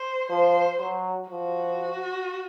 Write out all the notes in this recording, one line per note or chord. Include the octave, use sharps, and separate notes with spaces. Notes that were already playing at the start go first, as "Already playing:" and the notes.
Already playing: C5
F3 C5
F#3
F3 F#4